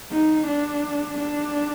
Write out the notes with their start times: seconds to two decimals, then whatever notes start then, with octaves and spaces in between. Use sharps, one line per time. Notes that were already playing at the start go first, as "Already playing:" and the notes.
0.11 D#4
0.47 D4
1.19 D4